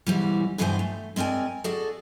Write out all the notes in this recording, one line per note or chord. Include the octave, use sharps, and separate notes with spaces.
G#2 B2 E3 G3
G2 B2 E3 B3 C5 G#5
A3
G#3 C4 A#4 D5 G#5
F#4 G#4 A4 D5